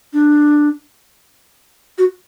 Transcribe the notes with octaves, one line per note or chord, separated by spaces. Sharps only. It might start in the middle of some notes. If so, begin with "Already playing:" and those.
D4
F#4